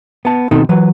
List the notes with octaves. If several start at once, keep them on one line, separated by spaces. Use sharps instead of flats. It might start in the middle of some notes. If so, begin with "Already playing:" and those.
B3 A5
B2 D#3 C4 D#4 A4
E3 F#3 B4